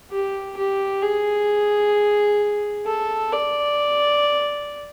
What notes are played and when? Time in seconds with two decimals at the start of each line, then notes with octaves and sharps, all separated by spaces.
0.11 G4
0.57 G4
1.03 G#4
2.86 A4
3.32 D5